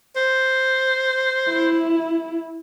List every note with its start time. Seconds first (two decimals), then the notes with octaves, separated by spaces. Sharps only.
0.16 C5
1.49 E4